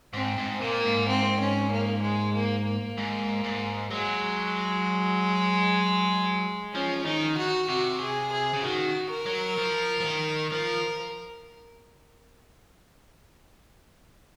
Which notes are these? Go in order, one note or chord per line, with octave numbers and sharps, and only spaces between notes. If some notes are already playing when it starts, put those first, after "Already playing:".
G#2 C4
G#2
A#2 A#3
G#2
C4
C#4
A#3
G#3
A#3
A#3
G#2
G#2
F#3 G#3
F3 C#4
D#3 D#4
F#4
C3 F#4
G#4
G#4
C#3
D#3 F#4
A#4
F#3
F3
F3
D#3
F3 A#4